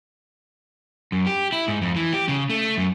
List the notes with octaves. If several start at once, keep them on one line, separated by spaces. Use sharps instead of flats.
F#2
G4
E4
G#2
F2
E3
G4
C#3
A3
F#2